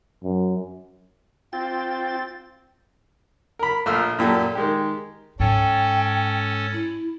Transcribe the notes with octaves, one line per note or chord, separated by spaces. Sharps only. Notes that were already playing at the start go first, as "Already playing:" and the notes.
F#2
C4 F4 G5 A6
A#4 B5
A#1 A3 F4 E6 F6
F#2 A#2 G4 A4
D#3 G#3 G4
G#2 C#4 A4 G5
E4